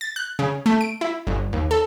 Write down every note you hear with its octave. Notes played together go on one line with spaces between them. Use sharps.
A6
F#6
C#3
A3
D7
E4
G1
D#2
A4